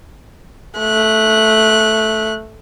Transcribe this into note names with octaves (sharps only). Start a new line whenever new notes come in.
A3 F#6